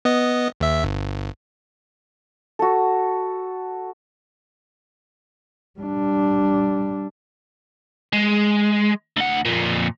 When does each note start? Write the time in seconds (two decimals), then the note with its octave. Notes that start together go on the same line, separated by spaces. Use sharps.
0.05 B3 D#5
0.60 D#2 E5
0.84 G1
2.59 F#4 A4
5.79 G3 D4
8.13 G#3
9.17 D2 F#5
9.45 F2 A#2